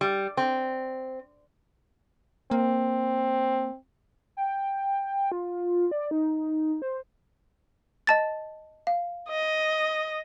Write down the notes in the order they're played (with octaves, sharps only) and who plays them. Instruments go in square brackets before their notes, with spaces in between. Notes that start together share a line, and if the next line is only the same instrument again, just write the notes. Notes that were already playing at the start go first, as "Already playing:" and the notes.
[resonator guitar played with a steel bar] G3
C4
[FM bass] A#3 [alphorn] C4
[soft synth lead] G5
F4
D5
D#4
C5
[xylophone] D#5 A5 A6
F5
[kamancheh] D#5